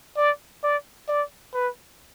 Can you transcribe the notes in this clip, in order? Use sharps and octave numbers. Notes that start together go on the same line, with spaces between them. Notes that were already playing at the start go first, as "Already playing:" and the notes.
D5
D5
D5
B4